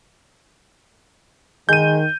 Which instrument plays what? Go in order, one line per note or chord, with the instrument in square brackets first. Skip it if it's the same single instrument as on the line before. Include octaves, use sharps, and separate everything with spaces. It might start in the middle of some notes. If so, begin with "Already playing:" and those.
[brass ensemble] D#3 [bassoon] G#3 [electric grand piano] G6 D#7